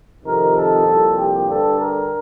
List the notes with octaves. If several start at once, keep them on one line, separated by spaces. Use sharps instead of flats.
F2 C3 D#3 A#4
A4
C2 A#2 F3
G4
G2 D3 G3 A4
A#4